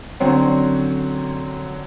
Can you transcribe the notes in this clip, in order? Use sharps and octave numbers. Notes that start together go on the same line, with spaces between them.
D3 F#3 C4 C#4